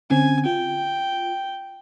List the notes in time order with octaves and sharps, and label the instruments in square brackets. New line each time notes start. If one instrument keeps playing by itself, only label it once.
[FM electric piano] D3 C4 C#4 [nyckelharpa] G#5
[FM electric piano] F4 [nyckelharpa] G5